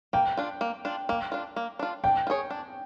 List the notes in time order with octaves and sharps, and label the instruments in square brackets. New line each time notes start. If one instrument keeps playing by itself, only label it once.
[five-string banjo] A#3 [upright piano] G5
[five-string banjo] D4 F4
A#3
D4 F4
A#3
D4 F4
A#3
D4 F4
[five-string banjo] D4 [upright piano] G5
[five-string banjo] F4
G#4 C#5
D4